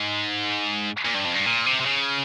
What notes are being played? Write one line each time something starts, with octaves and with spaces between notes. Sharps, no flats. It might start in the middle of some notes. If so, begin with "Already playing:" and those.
Already playing: G#2
A#2
G2
F2
G2
A#2
C3
C3
C#3